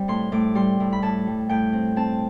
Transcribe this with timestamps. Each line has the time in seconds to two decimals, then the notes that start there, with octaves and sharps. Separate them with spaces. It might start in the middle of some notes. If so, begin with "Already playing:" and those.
Already playing: G3 C4
0.08 A2 C6
0.32 A2 D6
0.55 G3 C6
0.80 A2
0.92 B5
1.02 A2 A5
1.27 G3
1.49 A2 G5
1.73 C4
1.96 C4 A5